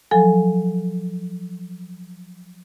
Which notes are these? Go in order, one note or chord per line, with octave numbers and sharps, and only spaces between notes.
F3 F#3 A4 G#5